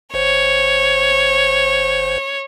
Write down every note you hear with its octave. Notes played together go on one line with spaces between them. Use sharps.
G1 C5 C#5